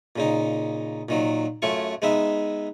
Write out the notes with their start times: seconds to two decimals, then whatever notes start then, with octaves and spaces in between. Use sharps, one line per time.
0.16 A#2 C#3 D#4
1.09 A#2 D#3 F#3
1.62 F#2 A3 C#4 F4 C#6
2.02 G#3 B3 D#4 E5